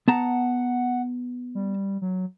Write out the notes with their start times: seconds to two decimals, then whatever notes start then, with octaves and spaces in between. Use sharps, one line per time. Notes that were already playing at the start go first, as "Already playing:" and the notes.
0.08 B3 F#5 A5 A#5
1.55 G3
2.02 F#3